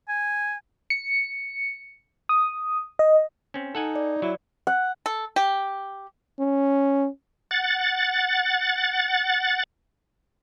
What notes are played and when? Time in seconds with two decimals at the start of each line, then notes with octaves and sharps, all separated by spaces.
0.09 G#5
0.90 C#7
2.29 D#6
2.99 D#5
3.54 C4 C#4
3.75 D#4 A4 F#5 G#5
3.96 D5
4.22 F#3 E4
4.67 F#5
5.06 A4
5.36 G4
6.39 C#4
7.51 F#5 A6